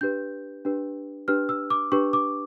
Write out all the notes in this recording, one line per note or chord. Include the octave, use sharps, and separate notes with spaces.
D4 G4 B4 G6
D4 G4 B4
D4 G4 B4 F6
E6
D6
D4 G4 B4 C#6
D6